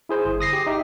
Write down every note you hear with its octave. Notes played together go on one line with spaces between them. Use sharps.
E4 G#4 C5
G1
D#6 A#6 C7
G4
D#4 G4 E5